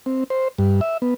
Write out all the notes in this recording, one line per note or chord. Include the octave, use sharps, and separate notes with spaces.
C4
C5
G2
E5
B3